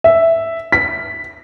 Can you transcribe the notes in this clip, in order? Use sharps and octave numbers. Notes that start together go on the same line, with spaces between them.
E5
B6